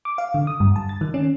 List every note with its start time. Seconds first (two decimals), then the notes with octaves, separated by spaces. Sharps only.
0.05 D6
0.18 F5
0.34 D3
0.47 D#6
0.60 G2
0.76 A5
0.89 A6
1.01 D#3
1.14 C#4